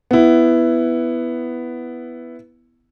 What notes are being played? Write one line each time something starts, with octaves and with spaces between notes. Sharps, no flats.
B3 E4